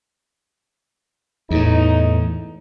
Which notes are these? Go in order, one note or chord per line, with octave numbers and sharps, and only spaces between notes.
E2 A2 D#4